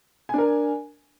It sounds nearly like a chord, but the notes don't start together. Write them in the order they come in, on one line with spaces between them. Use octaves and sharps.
G#5 D4 A#4